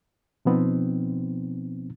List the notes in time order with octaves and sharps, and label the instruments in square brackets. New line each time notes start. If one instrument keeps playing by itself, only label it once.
[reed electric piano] B2 F3 B3 C4 D#4